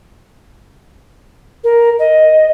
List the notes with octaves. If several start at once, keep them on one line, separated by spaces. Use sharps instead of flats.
A#4
D#5